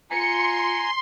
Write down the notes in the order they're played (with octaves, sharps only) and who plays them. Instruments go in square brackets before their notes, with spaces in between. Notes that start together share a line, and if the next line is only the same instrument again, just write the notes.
[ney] F4 [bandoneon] G#5 A#5 [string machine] C6 [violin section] C#7